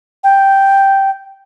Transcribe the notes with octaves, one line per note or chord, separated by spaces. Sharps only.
G5